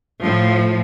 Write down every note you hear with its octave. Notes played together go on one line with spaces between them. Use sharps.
A2 F3